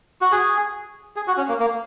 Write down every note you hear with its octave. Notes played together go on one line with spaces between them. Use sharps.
F#4
G#4
G#4
F#4
C#4
A#3
A#3